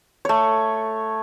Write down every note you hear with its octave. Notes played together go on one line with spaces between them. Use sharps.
A3 C#5